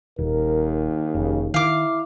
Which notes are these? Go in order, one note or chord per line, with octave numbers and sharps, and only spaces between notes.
D#1 D#2 A#4
F1 C#3
D#3 E4 F5 D6